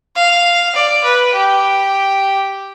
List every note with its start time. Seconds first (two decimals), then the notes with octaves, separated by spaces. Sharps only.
0.16 F5
0.75 D5
1.04 B4
1.33 G4